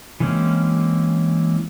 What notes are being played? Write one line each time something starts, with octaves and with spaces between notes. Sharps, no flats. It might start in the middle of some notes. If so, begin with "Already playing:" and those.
E3 G#3 A#3 C4 C#4